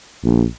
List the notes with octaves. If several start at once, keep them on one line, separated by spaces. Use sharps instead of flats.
A#1